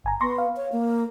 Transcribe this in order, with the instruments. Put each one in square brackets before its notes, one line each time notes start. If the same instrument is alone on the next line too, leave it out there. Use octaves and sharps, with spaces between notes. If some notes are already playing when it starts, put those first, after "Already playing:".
[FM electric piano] G1 G#5 A#5
[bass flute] B3 [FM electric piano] C6 C#6 A#6
[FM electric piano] F5
[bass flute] C#5
A#3